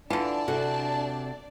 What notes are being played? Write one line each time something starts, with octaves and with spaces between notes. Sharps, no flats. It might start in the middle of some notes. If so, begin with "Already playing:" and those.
D3 E3 D4 F4 D5 A5
C3 F#4 A4